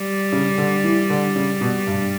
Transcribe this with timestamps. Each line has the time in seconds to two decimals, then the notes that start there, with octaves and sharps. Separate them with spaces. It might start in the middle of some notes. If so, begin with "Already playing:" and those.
Already playing: G3
0.32 C#3
0.58 D3
0.84 E3
1.10 D3
1.36 C#3
1.61 B2
1.87 G2